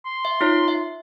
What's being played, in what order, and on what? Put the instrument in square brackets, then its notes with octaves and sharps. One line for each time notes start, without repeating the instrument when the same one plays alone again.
[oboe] C6
[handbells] E5
D#4 F4 C#5
E5